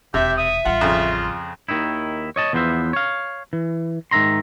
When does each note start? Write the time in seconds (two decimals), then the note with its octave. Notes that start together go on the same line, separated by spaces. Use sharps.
0.14 E1 D#2 C3 G4 E5
0.38 E5 D#6
0.65 A1 G3 F4 F#5
0.81 F2 C#3
1.69 D#2 D#3 D#4 E4
2.36 C#5 D#5 A5
2.53 E2 F3 B3 E4 C5 E5
2.93 C#5 F5
3.53 E3
4.11 G#2 D#3 E5 A#5 C6